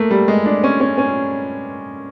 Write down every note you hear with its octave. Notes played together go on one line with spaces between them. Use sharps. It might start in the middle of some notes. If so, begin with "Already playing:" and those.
Already playing: A3 A#3
G3
G#3
D4
C#4
C#4
C#4